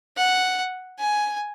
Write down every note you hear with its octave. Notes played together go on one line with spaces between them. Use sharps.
F#5
G#5